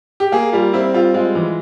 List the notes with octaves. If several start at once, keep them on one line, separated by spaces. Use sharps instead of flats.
G4
A#3 G#4
G3 F4
C4 E4
G3 F4
G#3 F4
E3